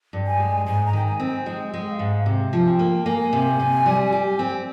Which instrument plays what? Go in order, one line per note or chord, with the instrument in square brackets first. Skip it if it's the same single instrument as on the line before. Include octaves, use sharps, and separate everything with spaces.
[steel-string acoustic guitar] G2
[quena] G#5
[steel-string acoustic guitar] G#3
[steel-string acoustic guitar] G#2 [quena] G#5
[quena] A#5
[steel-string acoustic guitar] D#3 [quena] G5
[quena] G#5
[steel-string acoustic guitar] C4
[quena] G#5
[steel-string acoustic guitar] G#3 [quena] G5
[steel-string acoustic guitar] G#3
[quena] G5
F5
[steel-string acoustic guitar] G#2
C3
F3
[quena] G#5
G5
[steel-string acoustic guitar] A#3
[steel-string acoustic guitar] A#3 [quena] G#5
[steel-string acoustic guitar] C3
C3
G3
G4
C4